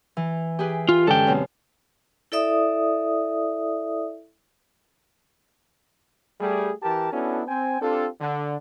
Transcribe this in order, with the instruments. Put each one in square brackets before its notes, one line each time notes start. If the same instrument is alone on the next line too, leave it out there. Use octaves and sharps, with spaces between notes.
[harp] E3
G4 G#4 B4
[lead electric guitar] F4
[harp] D3 G#3 C#4 [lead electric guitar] A4 G5
[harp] F#2 B2 C4
[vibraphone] E4 A4 D5 E5 D#6
[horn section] G3 A3 G#4
E3 G4 A#4 A5
B3 C#4 D4 E4 F#4 A4
C4 G5 G#5
C4 D4 F4 G4 A4
D3